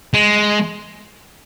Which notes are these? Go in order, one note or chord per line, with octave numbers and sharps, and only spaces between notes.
G#3